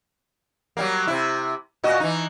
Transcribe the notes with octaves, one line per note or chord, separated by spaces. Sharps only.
F#3 G3 A#3
C3 E4
A#2 F#4 D#5
E3 D#4